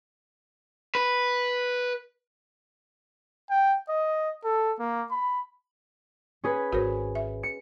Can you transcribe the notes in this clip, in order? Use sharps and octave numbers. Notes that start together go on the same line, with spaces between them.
B4
G5
D#5
A4
A#3
B5
C#4 G#4 B4
G#1 F#4 A#4 C5
E5
C#7